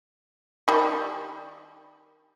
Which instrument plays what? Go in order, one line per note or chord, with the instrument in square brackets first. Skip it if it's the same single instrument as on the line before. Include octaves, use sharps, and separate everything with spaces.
[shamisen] D#3 G3